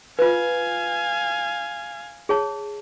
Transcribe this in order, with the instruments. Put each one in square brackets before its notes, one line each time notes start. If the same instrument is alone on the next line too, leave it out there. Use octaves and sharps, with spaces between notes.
[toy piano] F4 B4 [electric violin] F5 G#5
[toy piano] G#4 C#5 A5